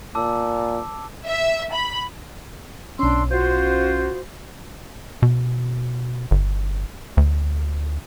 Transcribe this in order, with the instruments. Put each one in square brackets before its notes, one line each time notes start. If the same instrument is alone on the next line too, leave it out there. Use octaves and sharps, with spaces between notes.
[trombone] A#2 [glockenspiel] A5 D6 E6
[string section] E5
B5
[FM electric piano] B1 C#4 [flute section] D4 C6 E6
[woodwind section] F4 C5 [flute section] F#4
[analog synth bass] B2
G1
D2